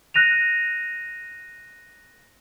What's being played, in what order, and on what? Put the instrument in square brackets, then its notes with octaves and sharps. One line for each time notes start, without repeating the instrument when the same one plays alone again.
[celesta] F#6 A#6 D#7 F7